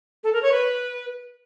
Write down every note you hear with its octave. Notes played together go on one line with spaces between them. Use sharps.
A4
A#4
C#5
B4